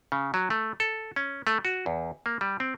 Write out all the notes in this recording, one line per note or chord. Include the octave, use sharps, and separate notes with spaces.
C#3
F#3
A3
A4
C#4
A3
F#4
E2
A#3
G3
C4